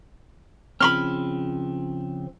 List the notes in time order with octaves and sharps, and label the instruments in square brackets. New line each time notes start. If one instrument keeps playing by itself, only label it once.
[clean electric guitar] C#3 F3 C4 [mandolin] B5 C6 F6